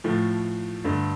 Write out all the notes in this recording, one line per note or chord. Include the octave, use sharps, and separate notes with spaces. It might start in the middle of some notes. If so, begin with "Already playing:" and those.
A2 F3 A3
G2 D3 A3